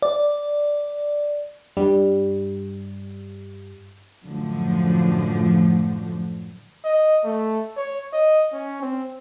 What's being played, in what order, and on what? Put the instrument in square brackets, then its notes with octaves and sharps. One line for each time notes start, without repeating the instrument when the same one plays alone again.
[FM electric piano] D5
G2 G3
[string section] F#2 A2 D3 F3
[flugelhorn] D#5
A3
C#5
D#5
C#4
C4